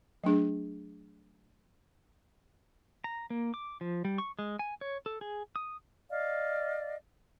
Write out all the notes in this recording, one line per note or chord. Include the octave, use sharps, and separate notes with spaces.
F#3 A3 D4 G#4
A#5
A#3
D6
F3
G3
C#6
G#3
G#5
C#5
A4
G#4
D#6
D5 D#5 F5